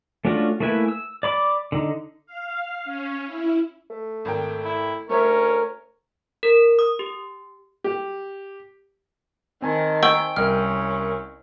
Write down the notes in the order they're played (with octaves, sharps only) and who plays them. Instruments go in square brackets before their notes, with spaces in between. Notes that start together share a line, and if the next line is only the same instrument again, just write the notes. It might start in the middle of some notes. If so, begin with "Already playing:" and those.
[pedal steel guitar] A3 C#4 D4 F4 F#4
A3 A#3 E4 B4 G#5
E6
D5 B5 D6
D3 D#4
[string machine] F5
C#4
E4
[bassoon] A3
[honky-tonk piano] G#1 A#4 G5
[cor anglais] E4
[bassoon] D2 [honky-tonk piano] A3 C#5 E5 [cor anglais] C#4 [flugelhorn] A#4
[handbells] A#4
D#6
G4
[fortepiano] G4
[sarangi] D#3 [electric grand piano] C4 G#5 A5
[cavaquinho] G5 [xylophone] C#6 E6
[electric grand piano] C2 A#4 [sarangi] C#4 [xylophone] F6